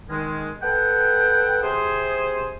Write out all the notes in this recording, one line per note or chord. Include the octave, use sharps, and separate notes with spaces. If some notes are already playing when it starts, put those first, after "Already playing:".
D#3 G#3
A4 B4 F#5 G5
C3 G#4 C5